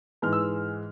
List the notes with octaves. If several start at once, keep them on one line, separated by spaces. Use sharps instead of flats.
G#2 E3 G#3 F6
E6